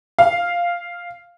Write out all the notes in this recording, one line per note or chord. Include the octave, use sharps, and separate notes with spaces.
F5